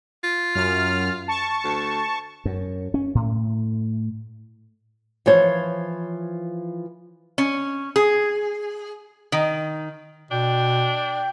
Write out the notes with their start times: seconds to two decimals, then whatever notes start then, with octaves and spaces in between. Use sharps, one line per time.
0.24 F4
0.55 F#2 F6
1.28 A5 C#6
1.64 D2
2.45 F#2
2.94 C#4
3.15 A2
5.26 E3 F3 C5 C#5
7.38 C#4
7.96 G#4
9.32 D#3
10.31 B2 D4 G5